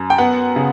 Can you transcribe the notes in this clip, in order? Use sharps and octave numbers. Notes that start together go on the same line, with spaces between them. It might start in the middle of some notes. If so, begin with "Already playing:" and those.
Already playing: F#2
G5
B3 F#5
C#3